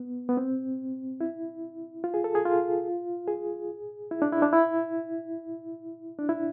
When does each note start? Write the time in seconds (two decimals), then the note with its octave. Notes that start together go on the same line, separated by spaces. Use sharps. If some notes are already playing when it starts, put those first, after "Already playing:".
Already playing: B3
0.29 B3
0.37 C4
1.21 E4
2.04 F4
2.14 G#4
2.24 A4
2.35 G#4
2.46 F4
3.28 G#4
4.11 E4
4.22 D4
4.32 E4
4.42 D4
4.53 E4
6.19 D4
6.29 E4